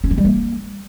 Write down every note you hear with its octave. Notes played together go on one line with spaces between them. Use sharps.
C#4
F3
G3
A#3